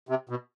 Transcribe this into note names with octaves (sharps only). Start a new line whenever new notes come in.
C3
B2